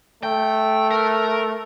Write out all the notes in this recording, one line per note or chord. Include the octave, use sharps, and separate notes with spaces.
A3 G5
A#4